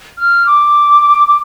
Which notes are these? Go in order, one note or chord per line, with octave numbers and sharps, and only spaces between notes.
F6
D6
D6